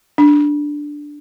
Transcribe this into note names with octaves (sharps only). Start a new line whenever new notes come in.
D4